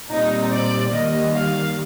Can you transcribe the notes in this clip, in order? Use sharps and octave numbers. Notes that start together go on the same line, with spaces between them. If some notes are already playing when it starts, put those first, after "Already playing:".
A#2 G3 C4 D#4
D5
D#3 G3 A#3 D#5
F5